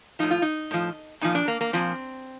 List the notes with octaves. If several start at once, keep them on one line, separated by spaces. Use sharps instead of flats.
A2 F3 D#4
F4
D#4
A2 F3
A#2 F3 D#4
D4
A#3
A#3
A#2 F3 C4